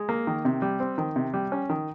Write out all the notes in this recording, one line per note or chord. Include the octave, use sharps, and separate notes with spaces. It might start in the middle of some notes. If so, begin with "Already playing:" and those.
Already playing: G#3
A#3
D#3
C3
G3
C4
D#3
C3
G3
C#4
D#3